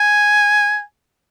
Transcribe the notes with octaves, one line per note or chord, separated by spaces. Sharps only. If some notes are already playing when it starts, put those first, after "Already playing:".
Already playing: G#5